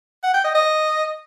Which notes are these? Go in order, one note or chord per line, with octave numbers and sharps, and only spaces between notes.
F#5
G5
D#5
D#5